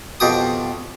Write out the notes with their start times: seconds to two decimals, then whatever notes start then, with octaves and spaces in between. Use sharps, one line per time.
0.20 F2 B2 G4 D#6